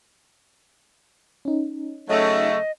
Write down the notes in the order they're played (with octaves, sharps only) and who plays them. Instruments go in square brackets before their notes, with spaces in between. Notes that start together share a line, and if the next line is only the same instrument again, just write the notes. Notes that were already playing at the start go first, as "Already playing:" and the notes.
[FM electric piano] C#4 D#4
[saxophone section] C#3 F#3 A3 [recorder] D#5